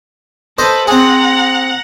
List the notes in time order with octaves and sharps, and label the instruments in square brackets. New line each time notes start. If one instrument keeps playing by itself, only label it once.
[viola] A4 B4 [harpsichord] C5 D#5
[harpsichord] C4 G#4 [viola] F#5 A#5